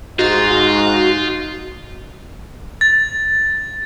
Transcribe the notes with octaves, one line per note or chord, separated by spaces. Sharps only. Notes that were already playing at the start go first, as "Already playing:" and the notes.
G#2 D#4 F4 F#4
A6